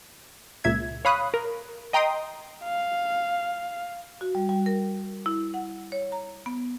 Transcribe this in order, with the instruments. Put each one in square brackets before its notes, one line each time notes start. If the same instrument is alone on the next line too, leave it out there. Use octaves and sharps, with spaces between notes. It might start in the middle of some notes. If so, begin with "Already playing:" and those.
[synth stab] C#2 A#2 E5 G#6
C#5 F5 B5 D#6 F#6
A#4
D#5 G5 A#5 C6 D#6
[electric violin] F5
[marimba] F#4
G3
G3
A#4
E4
F#5
C#5
A#5
B3